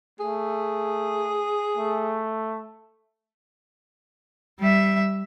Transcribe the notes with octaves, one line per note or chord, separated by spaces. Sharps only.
A3 G#4
A3
G3 E5